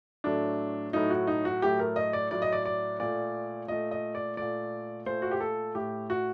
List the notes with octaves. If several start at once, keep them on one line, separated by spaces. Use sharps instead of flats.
A2 F#3 A3 D4
A2 F#3 A3 D#4
F#4
D#4
F#4
A2 F#3 A3 G4
A#4
D#5
D5
A2 F#3 A3 D5
D#5
D5
D5
A#2 A3 D5
A#2 A3 D#5
D#5
D5
A#2 A3 D5
A#2 A3 C5
F#4
G4
A4
A2 A3 G4
F#4